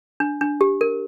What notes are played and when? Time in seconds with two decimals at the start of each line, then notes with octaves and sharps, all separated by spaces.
0.20 D4
0.41 D4
0.61 G4
0.81 A#4